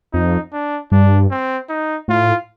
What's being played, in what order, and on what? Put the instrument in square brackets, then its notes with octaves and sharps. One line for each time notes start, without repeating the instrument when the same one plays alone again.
[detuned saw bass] F2 [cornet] D#4
[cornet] D4
[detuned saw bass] G2 [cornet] D4
[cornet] C4
D#4
[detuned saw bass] A2 [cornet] F4